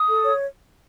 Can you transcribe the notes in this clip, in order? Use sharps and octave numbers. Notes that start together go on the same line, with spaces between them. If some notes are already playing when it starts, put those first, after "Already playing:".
Already playing: D#6
A4
C#5